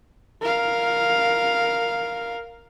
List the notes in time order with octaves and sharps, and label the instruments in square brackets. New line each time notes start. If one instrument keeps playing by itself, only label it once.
[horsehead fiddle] A#4 F5